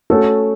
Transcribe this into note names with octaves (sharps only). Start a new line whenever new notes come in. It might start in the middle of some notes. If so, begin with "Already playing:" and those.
A3 C#4 F#4 A4